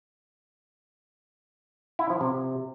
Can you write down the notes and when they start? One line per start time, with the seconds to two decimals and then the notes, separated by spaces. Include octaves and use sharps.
1.99 E4
2.10 F3
2.21 C3